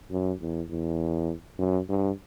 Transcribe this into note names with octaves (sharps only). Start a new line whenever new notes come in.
F#2
E2
E2
F#2
G2